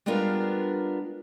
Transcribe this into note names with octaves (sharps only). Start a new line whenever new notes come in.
G3 G#3 B3 D4 F4 A#4